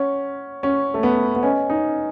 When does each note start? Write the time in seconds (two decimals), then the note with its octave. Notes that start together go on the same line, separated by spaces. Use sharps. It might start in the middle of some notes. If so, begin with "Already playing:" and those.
Already playing: C#4 C#5 F#5 C#6
0.63 C#4 C#5 F#5 C#6
0.94 A3
1.03 B3
1.35 B3
1.43 C#4 B4 D#5 G#5
1.70 D#4